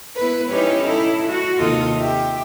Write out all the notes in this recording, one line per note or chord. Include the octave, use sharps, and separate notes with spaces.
B3 E4 B4
C#4 D#4 E4 G4 B4 C#5
D#4 E4 A4
F#4
D#2 C3 D#4 F4 A4 D#6
G4 E5 G5